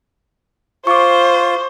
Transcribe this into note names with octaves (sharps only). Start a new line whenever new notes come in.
F4 C5 C#6 D6